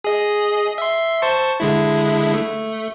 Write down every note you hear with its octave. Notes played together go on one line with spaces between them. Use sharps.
G#4 D#5
E5 C6
C5 A5 C#6
D3 G#3 E4
A3